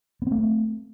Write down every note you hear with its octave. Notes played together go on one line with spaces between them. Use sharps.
A3 B3 C4